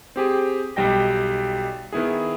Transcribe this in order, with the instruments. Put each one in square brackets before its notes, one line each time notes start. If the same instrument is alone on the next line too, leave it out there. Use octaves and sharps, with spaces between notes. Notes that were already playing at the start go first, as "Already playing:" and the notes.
[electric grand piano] C4 G4 G#4
B1 G3 D#5 G5 A#6
D#3 B3 E4 G#4